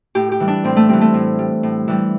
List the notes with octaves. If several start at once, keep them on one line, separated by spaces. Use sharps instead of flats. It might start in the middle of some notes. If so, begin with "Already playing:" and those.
A2 G4
G4
E3 G3
D4
A2 C4
A3
E3 G3 C4
A3
A2
G3
A2
E3 G3